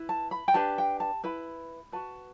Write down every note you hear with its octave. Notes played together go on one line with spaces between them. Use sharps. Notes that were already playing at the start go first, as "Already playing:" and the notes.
Already playing: E4 B4
A5
B5
G5
D4 G4 B4 A5
G5
A5
E4 B4 B5
F#4 B4 A5